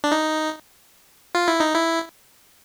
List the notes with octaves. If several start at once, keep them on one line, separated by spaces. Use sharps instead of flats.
D4
D#4
F4
E4
D#4
E4